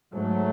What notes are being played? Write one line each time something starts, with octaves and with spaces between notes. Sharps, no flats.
G#2 F#3 A3